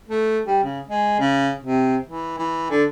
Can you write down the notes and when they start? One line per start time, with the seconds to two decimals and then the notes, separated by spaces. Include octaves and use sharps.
0.08 A3
0.45 G3
0.63 C#3
0.88 G#3
1.20 C#3
1.63 C3
2.05 E3
2.38 E3
2.70 D3